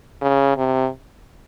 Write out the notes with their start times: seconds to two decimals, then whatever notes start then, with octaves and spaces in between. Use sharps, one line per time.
0.22 C#3
0.57 C3